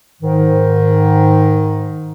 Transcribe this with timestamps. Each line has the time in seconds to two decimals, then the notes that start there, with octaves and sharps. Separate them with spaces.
0.21 G#2 D#3